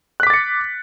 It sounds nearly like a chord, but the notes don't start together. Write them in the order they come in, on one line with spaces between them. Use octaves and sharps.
F#6 B6 D6 A6 C#7